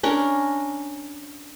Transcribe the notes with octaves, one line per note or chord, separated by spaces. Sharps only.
C#4 D4 A#4